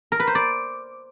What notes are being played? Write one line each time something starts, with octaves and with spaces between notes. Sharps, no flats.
A#4
B4
C5
D5